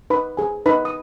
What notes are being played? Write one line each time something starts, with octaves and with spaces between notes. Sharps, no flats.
D#4 B4 B5
G#4 C5 G#5
D#4 B4 B5
D#6